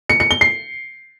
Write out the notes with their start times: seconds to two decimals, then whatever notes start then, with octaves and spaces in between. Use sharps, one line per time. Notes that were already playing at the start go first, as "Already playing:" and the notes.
0.09 C#7
0.20 C#7
0.31 G7
0.41 C7